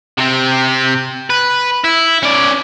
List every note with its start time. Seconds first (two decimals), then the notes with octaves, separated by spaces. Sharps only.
0.18 C3 C4
1.30 B4
1.84 E4
2.23 C#4 D5